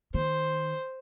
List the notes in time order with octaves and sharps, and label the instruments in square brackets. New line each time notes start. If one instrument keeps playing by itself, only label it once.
[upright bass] D#3 [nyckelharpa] C5